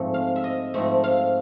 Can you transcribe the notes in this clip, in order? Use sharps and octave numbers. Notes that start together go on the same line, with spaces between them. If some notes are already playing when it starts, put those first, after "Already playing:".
Already playing: G#2 F3 A3 C4
F5
E5
D#5
G#2 F3 A3 C4 E5
F5